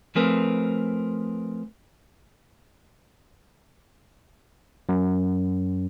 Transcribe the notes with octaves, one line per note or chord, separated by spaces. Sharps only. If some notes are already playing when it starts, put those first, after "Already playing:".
F3 A3 C4 G#4 A#4 B4
F#2